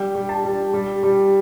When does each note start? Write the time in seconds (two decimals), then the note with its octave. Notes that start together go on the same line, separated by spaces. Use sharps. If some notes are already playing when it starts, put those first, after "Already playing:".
Already playing: G3 G5
0.15 G3
0.29 A5
0.44 G3
0.73 G3
1.03 G3